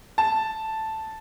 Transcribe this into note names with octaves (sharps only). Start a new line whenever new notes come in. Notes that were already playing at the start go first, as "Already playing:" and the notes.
A5